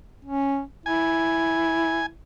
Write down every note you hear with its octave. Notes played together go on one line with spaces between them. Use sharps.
C#4
E4 G#5